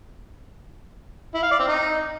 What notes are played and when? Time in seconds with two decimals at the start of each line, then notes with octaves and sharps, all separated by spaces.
1.34 E4
1.43 F5
1.51 D5
1.60 C4
1.68 D#4